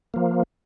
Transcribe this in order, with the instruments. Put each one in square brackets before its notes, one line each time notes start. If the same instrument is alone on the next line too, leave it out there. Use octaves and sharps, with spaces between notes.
[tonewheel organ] F3 A#3